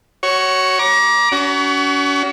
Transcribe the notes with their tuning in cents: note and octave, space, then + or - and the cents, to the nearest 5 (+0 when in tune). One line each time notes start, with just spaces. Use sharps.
F#4 +20 C#5 +0
A#5 +35 D6 +0
C#4 +40 F#4 +25